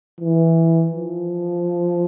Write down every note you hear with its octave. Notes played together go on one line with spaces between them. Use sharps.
E3
F3